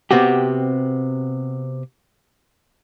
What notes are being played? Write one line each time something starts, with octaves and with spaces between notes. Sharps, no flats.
C3 B3 C4 F#4 G4